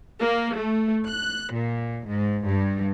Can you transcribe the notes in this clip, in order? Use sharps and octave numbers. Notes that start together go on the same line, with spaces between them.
A#3
A3
F#6
A#2
G#2
G2